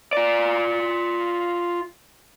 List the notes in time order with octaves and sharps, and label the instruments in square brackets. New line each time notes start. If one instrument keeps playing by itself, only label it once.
[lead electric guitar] F4 D5